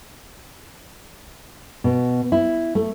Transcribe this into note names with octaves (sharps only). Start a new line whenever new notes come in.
B2
E4
A3